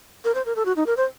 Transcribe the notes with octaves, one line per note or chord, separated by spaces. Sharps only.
A#4
C5
A#4
A4
F#4
D#4
A#4
C5